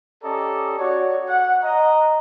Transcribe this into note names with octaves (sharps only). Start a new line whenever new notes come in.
C#4 G4 A4 D5 D#5 A#5
F#4 C#5 D5
F#5
D#5 A#5